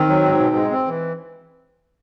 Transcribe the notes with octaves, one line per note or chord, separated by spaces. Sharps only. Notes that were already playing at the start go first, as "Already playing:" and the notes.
Already playing: D#3 C4
F#3
G#2
B2
G#3
C4
E3